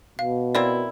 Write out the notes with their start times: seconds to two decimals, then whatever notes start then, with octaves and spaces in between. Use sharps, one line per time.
0.19 B2 F5
0.55 A#3 C4 E4 D5